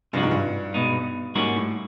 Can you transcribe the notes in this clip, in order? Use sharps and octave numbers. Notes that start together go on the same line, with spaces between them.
G2 C3 F3 G#3 C#4 F#4
G#2
G2
B2 G#3 B3 D#4
G#2 G3 A#3 C#4 F#4
A2